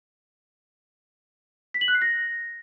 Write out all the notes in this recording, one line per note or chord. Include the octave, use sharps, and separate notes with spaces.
B6
F#7
F#6
C7
A#6